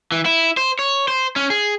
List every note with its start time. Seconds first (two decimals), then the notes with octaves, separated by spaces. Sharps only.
0.12 E3
0.26 E4
0.57 C5
0.79 C#5
1.08 C5
1.36 C#4
1.50 G#4